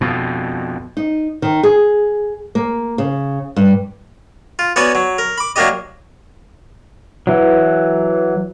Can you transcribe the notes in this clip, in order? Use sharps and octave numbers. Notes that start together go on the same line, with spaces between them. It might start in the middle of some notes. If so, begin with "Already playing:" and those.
F2 B2
D#4
D#3
G#4
A#3
C#3
G2
F4
B3 C#4 F#4 D5 G#5
F#3
A#4
B5 D6
F#3 A#3 D4 G4 D#5
E3 F#3